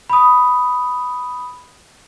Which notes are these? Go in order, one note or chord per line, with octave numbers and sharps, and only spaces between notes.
B5 D#6